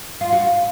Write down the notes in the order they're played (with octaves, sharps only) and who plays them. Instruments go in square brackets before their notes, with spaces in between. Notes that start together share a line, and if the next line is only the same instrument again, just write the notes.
[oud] F4
F#4